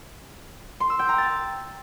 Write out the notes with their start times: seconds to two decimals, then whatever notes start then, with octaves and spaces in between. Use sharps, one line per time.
0.80 C6
0.90 E6
0.99 G5
1.09 A#5
1.18 A6